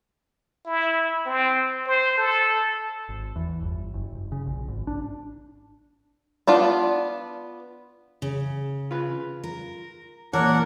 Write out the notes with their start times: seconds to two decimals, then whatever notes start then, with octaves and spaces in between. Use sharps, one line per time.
0.67 E4
1.26 C4
1.87 C5
2.17 A4
3.09 G#1
3.36 E2
3.63 G1
3.94 F#1
4.15 F#1
4.32 C#3
4.47 A#1
4.68 G#1
4.87 D4
6.47 B3 D4 F4 D5
8.22 C#3
8.91 F4 B4
9.44 A#4
10.33 A#2 E3 D4 A#4 C#5 F#5